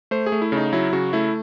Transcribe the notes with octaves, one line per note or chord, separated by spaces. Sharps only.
A3 C5
G#4
A3
E4
C#3
D#4
F#3 E4
C#3 F#4
A3 E4